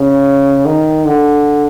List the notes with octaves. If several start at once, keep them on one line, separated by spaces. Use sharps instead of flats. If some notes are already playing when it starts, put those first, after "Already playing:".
Already playing: C#3
D#3
D3